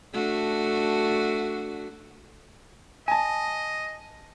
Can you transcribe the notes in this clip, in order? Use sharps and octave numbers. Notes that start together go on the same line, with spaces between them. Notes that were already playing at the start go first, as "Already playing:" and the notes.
A3 D4 F#4
D#5 G#5 A5